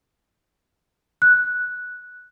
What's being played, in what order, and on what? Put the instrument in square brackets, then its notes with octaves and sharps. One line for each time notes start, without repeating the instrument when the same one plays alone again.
[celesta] F#6